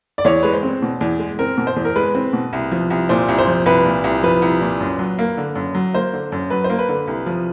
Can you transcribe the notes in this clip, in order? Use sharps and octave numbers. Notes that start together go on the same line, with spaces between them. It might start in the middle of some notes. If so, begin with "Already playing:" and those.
D5
E2 C#5
G#3 B4
C5
C4
B2
E2
G#3
C4 A#4
B2
C5
E2
A#4
G#3 B4
C4
B2
C2
F3
C2
A#2 C5
C2
C5
F3
C2 B4
A#2
C2
F3 B4
C2
A#2
F#2
F#3
A#3
D3
F#2
F#3
A#3 C5
D3
F#2
F#3 B4
C5
A#3
B4
D3
C2
F3